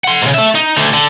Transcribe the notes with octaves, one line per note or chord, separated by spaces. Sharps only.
F#5 C6
G#2 C#3
A3 E5
D#4
D2 D3
D3